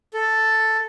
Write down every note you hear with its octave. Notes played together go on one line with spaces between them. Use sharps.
A4